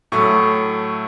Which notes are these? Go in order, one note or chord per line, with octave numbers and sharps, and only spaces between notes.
A2 F#3 A3 C#6